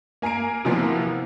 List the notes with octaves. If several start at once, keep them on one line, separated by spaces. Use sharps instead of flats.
A#3 G#5 A#5 C7 D7
C3 E3 F3 A#3 B3